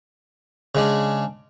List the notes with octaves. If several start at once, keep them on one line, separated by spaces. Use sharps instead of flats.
C#3 G#3 D4